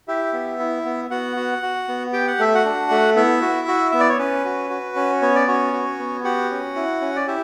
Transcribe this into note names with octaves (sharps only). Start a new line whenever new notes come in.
E4 G4 E5
B3
E4
B3
B3 F#4 F#5
F#4
F#4
B3
G4 G5
F#5
A3 E5
F#4 F#5
D4
A3
B3 E4 E5
F#4
F#4
B3 E5
D5
C#5
C#4 B4
F#4
F#4
C#4
B3 C#5
D5
C#4 F#4 C#5
F#4
B3
F#4 G4 F#5
C#4
E4
C#4
D5
E4 G4 E5